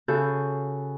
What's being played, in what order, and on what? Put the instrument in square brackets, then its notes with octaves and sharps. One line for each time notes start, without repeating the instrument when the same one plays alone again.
[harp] C#3 F#4 A4 B5 G6